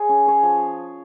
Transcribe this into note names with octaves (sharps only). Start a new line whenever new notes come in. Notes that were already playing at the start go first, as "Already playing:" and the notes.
Already playing: G#4 C#5
C#4
G#4 C#5
F3